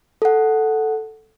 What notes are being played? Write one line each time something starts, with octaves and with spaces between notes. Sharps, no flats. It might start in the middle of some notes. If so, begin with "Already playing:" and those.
A4 F#5